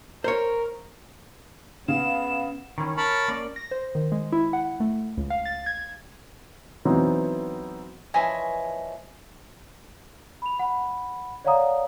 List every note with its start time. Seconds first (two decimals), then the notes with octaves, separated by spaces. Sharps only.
0.24 A#4 C5 C#5
1.88 C#3 B3 E7
2.78 D#3 E3 C#4
2.97 A#4 C#5 A5 B5
3.28 A#3 C#4 D5
3.56 A#6
3.71 C5
3.95 D#3
4.12 G#3
4.32 E4
4.53 F#5
4.80 A3
5.17 C#2
5.30 F5
5.45 A6
5.66 G#6
6.85 E3 F#3 B3 C4 D#4
8.14 E3 F3 C#4 D#5 E5 G#5
10.42 B5 F7
10.59 F#5 B5
11.45 C#5 D5 F5 F#5 A#5 D#6